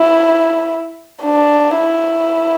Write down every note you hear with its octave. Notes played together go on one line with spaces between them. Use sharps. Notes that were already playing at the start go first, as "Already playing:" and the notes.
Already playing: E4
D4
E4